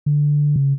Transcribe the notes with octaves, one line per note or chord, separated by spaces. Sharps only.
D3
C#3